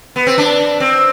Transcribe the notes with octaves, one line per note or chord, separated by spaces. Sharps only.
B3
C4
D4
C4